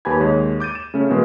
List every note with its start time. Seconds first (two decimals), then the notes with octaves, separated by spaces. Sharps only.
0.05 D#2 G4 B4 G#5 B5 G#6
0.20 D#2 G#3 C#5
0.60 D6 G6 A6 D#7
0.75 E7
0.94 C#3 A3 C#4
1.10 B2 E3 G#3 A#3 B3